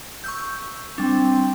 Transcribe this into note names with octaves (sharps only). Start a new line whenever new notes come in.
C#6 E6 G6
G3 C4 D4